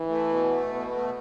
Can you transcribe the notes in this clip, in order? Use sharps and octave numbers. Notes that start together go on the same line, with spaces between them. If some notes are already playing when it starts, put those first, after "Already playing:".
Already playing: E3
A3
B2
A3
B2 B3
A3